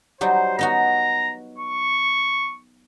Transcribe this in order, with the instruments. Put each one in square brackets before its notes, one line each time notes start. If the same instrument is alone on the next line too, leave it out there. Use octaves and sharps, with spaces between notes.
[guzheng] F#3 G3 D#4 [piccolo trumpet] C5
[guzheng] B3 D#4 F#4 [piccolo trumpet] A#5
[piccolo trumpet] C#6